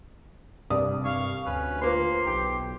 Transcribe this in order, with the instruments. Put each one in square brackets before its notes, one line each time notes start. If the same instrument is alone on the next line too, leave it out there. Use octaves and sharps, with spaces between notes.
[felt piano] C2 D5 D#6 [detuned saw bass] G2
[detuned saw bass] G2 [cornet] F5 [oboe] C#6
[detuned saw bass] D2 [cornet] C#4 [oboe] B4
[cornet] A#3 [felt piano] F4 B4 C5 [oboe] C6
[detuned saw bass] B1 [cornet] G4